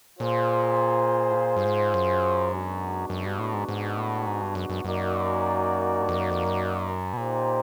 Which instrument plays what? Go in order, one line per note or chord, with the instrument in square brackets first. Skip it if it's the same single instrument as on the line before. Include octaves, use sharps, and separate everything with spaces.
[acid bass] A#2 [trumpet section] F4 G#4 C5
[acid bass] A2
A#2
G2
G#2
F#2
[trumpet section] G#3 B3 D4 F#4
[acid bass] F#2
G2
A2
G#2
G#2
A2
G#2
G2
F#2
F#2
[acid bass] F#2 [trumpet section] A#3 D#4 F#4 A#4 D5
[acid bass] G2
F2
F#2
F2
F#2
B2
[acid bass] A#2 [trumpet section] D#4 G4 C5